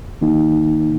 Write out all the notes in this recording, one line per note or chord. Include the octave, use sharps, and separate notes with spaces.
D#3 A#3 D#4